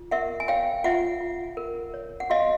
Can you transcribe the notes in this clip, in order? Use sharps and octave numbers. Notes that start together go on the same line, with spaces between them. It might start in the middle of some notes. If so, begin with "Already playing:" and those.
Already playing: F4
A#4 E5 F#5
G#5
C#5 F5 G5
F4 E5 F#5
F4
A#4
C#5
F#5
F#4 D#5 F5